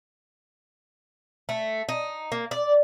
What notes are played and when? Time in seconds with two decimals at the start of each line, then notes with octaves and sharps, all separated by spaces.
1.49 A3
1.89 D#4
2.32 A#3
2.51 D5